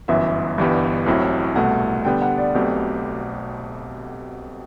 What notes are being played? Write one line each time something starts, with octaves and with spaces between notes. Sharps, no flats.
G1 F#2 E3 B3 E5
G1 G2 E3 G3 B3
A1 A2 F#3 C4 E4
C2 B2 A3 F#5
D3 G3 B3 G5
F#5
D5
B1 B2 A3 C4 G4